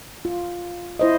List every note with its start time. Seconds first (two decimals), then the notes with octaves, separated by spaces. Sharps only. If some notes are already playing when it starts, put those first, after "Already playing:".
0.25 F4
0.99 E4 C5 D#5